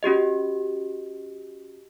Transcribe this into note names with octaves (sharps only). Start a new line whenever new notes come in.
C#4 F#4 G4 D#5